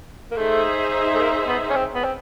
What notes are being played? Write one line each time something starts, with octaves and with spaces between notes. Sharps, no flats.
A#3
A3 D#4 G#4 C5 E5
A3
A#3
B3
C#4
C4
B3
C4